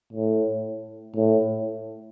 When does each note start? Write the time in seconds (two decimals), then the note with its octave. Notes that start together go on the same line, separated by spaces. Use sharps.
0.13 A2
1.16 A2